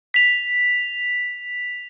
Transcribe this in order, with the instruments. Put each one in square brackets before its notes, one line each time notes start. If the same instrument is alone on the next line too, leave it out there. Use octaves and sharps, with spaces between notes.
[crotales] B6 F7